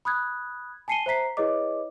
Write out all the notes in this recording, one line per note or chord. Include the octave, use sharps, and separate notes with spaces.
B5 D#6 F#6 G#6
G#5 A5 C7 C#7 D#7 G7
C5 E5 A#5 B6 C7
E4 G#4 B4 C#5 D#5 D6